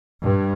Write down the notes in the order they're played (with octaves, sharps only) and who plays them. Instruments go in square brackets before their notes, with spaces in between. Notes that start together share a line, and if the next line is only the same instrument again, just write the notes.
[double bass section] G2